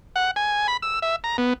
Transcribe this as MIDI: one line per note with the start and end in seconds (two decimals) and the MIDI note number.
0.16 0.31 78
0.36 0.67 80
0.68 0.77 83
0.82 0.99 88
1.02 1.16 76
1.24 1.37 82
1.38 1.53 59